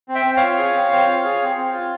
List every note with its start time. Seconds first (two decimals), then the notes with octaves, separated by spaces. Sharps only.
0.09 C4
0.15 E5 G5
0.26 C4
0.37 C#5 F5
0.43 F4
0.58 G#4
0.74 C4
0.91 C4
1.07 F4
1.24 G#4
1.42 C4
1.57 C4
1.73 F4